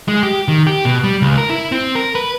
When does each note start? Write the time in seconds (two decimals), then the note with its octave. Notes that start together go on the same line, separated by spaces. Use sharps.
0.08 G#3
0.23 G4
0.48 D#3
0.67 G4
0.85 B2
1.03 G3
1.22 C#2
1.38 A#4
1.50 E4
1.72 C4
1.95 A#4
2.15 B4